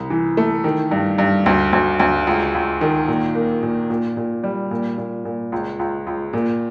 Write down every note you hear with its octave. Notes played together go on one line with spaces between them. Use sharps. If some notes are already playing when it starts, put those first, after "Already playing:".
Already playing: C2
E3
A3
D#3
G2
G2
D2
D2
D2
C#2
C#2
D#3
A#2
A#3
A#2
A#2
A#2
G3
A#2
A#2
A#2
C#2
C#2
C#2
A#2